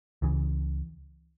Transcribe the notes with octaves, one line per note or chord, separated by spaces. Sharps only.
C#2 C#3 E3